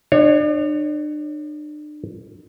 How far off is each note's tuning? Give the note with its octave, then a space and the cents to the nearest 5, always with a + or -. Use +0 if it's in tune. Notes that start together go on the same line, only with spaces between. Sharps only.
D4 +40 C#5 +0